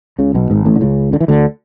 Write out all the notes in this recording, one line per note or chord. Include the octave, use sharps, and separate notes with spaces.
C#2 C#3
B1 B2
G#1 G#2
A1 A2
D3
C#2 C#3
D3
E3
D2 D3